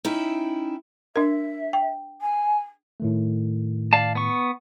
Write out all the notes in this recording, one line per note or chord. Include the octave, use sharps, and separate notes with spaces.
C#4 D#4 E4 E5 G5
D4 A#4 E5
G5
G#5
A2 D#3 A3
D5 F5 A5
B3 C#6